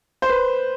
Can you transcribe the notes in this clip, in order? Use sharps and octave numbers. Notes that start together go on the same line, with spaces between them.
C5
B4